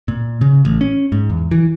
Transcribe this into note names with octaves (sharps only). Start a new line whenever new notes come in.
A#2
C#3
A1
C#4
G#2
E2
E3